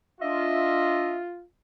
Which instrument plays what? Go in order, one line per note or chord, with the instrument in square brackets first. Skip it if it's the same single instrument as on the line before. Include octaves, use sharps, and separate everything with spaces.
[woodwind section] D4 D#5 E5 [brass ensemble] F4